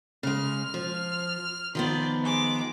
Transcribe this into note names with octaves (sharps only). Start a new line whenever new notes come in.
C#3 G#3 F6
F3
D#3 F3 B3 D5 C6
G#3 D6